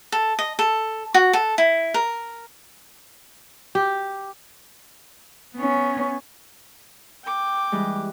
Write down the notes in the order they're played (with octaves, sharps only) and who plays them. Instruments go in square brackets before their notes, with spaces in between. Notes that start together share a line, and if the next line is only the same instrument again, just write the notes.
[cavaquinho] A4
D#5
A4
F#4
A4
E4
A#4
[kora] G4
[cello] B3 C#4
[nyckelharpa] G5 D6
[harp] E3 G3 G#3